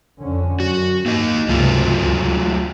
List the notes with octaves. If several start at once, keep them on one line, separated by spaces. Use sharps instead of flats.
F2 D3 C#4
F#2 F#4
G#2 A#3 D#4 D#5
C#2 G2 C3 F#3 A3 F4
D2